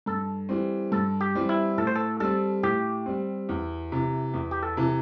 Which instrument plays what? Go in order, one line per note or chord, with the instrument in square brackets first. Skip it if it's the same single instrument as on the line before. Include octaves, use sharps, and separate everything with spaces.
[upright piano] G2 [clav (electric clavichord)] A4
[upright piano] E3 G3 C4
[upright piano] G2 [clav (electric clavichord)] A4
[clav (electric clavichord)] G4
[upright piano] E3 G3 C4
[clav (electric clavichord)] E4
[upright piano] A2 [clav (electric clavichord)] A4
[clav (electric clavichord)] C5
A4
[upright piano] G3 C4 [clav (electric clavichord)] A4
[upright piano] A2 [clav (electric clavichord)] G4
[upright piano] G3 C4
E2
C3 E3
E2
[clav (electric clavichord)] G4
A4
[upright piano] C3 E3